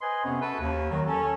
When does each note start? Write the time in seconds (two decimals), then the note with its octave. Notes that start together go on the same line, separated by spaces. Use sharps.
0.01 B4 C5 D#5 G#5 C6
0.25 F2 C3 B3 C#4
0.42 F#4 A4 B4
0.61 D#2
0.91 D#3 F#3
1.06 C#4 A4